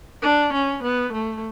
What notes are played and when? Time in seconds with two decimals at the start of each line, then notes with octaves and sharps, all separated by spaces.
0.22 D4
0.52 C#4
0.83 B3
1.13 A3